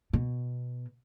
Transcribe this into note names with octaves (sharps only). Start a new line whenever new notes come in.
B2